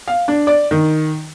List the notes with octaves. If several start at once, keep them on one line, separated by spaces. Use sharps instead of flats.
F5
D4
D5
D#3